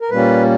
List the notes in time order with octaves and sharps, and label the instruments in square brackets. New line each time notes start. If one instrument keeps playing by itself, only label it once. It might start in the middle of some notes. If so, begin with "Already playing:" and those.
[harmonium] A#4
A#2 G3 A#3 C#4 B4